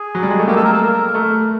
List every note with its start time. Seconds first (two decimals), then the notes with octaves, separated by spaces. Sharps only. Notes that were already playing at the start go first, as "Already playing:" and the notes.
Already playing: G#4
0.15 F#3
0.23 G3
0.30 G#3
0.39 A3
0.47 A#3 G4
0.56 A4
0.64 A#4
0.73 A4
0.82 A#4
1.14 A3